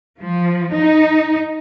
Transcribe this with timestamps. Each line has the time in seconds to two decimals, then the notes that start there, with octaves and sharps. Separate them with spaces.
0.22 F3
0.78 D#4